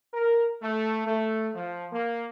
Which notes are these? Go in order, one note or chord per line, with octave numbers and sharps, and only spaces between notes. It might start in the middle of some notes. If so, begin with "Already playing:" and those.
A#4
A3
A3
F3
A#3